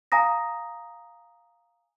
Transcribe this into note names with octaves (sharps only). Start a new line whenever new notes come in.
F5 G#5 A#5 D#6 A#6